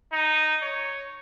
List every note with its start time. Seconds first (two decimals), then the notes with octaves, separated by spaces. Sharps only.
0.12 D#4
0.62 C#5